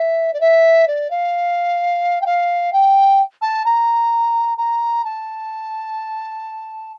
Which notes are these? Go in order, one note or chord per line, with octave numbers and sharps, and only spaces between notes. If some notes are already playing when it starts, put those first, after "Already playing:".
Already playing: E5
D5
E5
D5
F5
G5
F5
G5
A5
A#5
A#5
A5